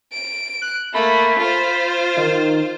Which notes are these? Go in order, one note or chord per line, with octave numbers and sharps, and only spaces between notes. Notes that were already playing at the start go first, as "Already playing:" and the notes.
D7
F#6
A3 A#3 B5
F4 C5
D#3